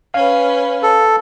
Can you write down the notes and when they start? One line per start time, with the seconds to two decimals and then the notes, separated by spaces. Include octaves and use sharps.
0.14 C#4 B4 F5
0.83 A4